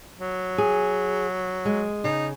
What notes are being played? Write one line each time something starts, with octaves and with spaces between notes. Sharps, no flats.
F#3
G#4
G#3
C#3 D#4